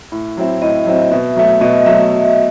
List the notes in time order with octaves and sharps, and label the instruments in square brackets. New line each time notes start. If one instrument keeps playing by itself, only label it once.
[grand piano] A2
F#3 C4 E4
[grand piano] A2 [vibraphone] D#5
[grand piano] F#3 C4 E4
[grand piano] B2 [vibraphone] E5
[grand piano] F#3 A3
[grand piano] B2 [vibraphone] D#5
[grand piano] F#3 A3 [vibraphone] E5